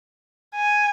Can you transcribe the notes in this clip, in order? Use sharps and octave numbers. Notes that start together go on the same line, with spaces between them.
G#5